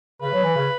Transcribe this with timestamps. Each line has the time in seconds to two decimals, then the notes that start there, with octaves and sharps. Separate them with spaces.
0.21 C#3 B4
0.32 F#3
0.44 E3
0.56 C#3